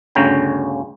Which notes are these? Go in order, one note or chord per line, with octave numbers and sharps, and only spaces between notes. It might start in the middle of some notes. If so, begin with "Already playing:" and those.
G1 D2 C#3 C#4 G5 A#5